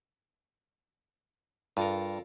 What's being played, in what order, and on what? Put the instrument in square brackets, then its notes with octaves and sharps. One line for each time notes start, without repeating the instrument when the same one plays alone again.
[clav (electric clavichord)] G2 [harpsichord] F4 A4 A#4